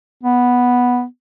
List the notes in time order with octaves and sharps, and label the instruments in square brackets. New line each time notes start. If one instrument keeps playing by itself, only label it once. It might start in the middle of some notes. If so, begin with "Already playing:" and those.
[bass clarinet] B3